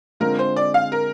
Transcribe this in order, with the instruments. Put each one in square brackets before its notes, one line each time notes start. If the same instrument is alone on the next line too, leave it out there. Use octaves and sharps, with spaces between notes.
[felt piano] D3 G#3 C4 F4 [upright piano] A#4
[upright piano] C5
D5
F5
A#4